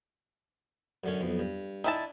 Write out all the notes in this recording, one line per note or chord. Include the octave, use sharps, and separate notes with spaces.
F#2 D3 C#4
B1 F2
G2
D#3 D4 E4 A5